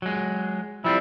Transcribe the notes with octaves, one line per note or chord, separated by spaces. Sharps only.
F#3 G#3
F3 G3 C4 E4